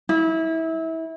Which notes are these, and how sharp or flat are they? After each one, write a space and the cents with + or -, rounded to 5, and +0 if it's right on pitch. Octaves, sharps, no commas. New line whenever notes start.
E4 -25